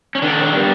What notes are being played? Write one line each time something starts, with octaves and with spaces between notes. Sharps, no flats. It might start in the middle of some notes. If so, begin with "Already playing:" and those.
C#4
D#3 D4
G3 B3